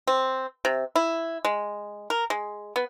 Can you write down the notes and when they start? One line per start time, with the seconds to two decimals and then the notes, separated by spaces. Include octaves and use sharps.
0.07 C4
0.65 C3
0.95 E4
1.45 G#3
2.10 A#4
2.30 G#3
2.76 B3